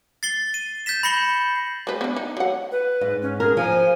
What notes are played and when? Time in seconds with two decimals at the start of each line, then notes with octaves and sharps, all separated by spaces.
0.23 A6 C7 G7
0.54 D#7
0.86 G6 A6 B6 E7
1.03 B5 A#6 C7 C#7 F#7 G7
1.87 G#3 B4
2.01 B3 D4
2.16 D#4
2.37 F#3 F#5
2.72 B4
3.01 G#2
3.22 C#4
3.40 G#4 A#4
3.57 F3 G#5